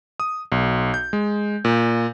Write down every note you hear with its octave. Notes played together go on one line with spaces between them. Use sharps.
D#6
B1
G6
G#3
A#2